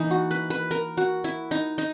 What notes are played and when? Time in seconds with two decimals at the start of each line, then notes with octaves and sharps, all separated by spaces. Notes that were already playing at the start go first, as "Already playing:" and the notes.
Already playing: E3 A#3 D#4
0.11 F#4
0.31 B4
0.50 B4
0.71 A#4
0.97 F#4
1.24 E4
1.51 D#4
1.78 D#4